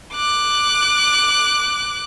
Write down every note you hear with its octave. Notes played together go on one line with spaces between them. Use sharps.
D6 F#6